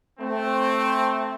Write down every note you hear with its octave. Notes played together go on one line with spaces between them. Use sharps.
A3 C4